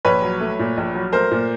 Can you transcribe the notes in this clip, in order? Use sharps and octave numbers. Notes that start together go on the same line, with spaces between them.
A#1 B4 C#5
F#3
A3
A#2
A#1
F#3
A3 A#4 C5
A#2